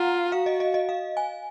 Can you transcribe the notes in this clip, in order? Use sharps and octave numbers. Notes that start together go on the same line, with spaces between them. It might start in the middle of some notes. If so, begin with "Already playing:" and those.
Already playing: F4 F5 F#5 A#5
F#4 F5
D#5
D#5
D#5
F5
G#5